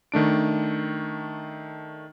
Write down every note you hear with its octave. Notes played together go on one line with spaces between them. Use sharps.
D#3 A3 D4 D7